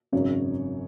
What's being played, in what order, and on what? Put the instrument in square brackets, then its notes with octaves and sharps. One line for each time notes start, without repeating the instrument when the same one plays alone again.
[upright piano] G#1 F#2 C#3 F#3 C#5